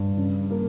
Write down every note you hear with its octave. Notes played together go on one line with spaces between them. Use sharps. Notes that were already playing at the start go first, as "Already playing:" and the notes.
Already playing: G2
C#3
A#3